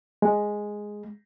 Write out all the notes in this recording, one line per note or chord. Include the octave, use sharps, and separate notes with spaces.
G#3